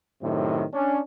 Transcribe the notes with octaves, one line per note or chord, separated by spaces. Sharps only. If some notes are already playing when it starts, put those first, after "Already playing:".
F#2 A2 C3 D#3
C#4 D4